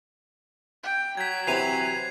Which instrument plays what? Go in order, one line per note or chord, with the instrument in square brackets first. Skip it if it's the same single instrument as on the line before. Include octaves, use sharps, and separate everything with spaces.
[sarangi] G5
[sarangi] F#3 [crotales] G#6 B6
[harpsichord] C3 E3 [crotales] C7 D#7 F7